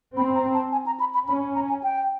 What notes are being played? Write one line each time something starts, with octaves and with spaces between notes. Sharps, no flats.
C4 B5
A#5
A5
G#5
A#5
B5
B5
C#4 B5
A#5
G#5
G5